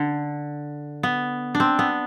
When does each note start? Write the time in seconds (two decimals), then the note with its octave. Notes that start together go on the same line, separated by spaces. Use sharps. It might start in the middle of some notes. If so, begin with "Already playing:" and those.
Already playing: D3
1.03 B3
1.55 D4
1.60 C4
1.79 B3